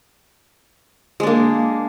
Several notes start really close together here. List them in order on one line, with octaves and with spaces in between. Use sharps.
G#3 D4 A#3